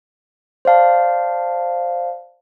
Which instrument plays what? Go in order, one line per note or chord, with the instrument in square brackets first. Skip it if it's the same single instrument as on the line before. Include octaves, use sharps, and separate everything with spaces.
[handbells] C5 D5 F5 A5